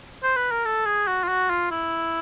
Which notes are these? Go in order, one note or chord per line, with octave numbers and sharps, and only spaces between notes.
C5
B4
A#4
A4
G#4
F#4
F4
F#4
F4
E4